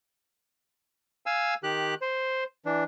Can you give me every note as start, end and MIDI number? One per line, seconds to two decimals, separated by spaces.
1.26 1.54 77
1.26 1.54 80
1.26 1.54 88
1.63 1.95 51
1.63 1.95 67
1.63 1.95 90
2.02 2.44 72
2.66 2.84 52
2.66 2.84 62